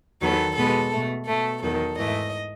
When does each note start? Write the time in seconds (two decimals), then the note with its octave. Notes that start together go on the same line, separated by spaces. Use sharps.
0.21 E2 D#3 F#3 B3 A4
0.56 B2 G#3 B3 A4
0.92 B2 A3
1.27 B2 A3 A4
1.62 E2 D#3 F#3 A4
1.97 G#2 E3 A3 D#5